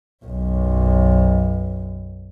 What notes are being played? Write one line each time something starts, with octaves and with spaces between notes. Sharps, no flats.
B1 F#2